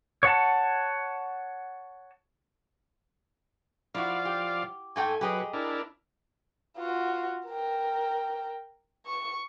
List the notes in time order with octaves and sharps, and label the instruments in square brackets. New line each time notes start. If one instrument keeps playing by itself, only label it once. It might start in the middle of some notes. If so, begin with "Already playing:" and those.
[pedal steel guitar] C#5 F#5 A5
[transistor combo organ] F3 D5 F5 [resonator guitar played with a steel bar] E4 F#4
[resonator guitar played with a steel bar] G4
[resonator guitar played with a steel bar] G#2 A3 G5 [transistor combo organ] G#5
[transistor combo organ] F#3 B4 [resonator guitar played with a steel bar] G4 G#4 D#5
[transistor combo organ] D4 E4 A#4
[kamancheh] F4 F#4
A#4 G5
C#6